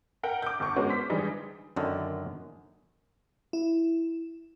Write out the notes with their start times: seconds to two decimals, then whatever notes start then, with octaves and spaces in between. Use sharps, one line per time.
0.23 A#4 F#5 G5 A#5
0.42 D6 G6
0.60 G1 D2 C#6
0.76 G#3 B3 C#4 F#4 A#4
0.89 C5 B6
1.10 D3 E3 G3 G#3 D#4 G#4
1.76 F#2 D3 D#3
3.53 E4